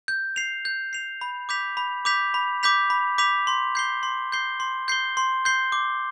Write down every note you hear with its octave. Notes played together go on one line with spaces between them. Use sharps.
G6
C7 F7
G6
C7 F7
B5
D6 G6 B6 F7
B5
D6 G6 B6 F7
B5
D6 G6 B6 F7
B5
D6 G6 B6 F7
C6
G6 C7 G7
C6
G6 C7 G7
C6
G6 C7 G7
C6
G6 C7 G7
D6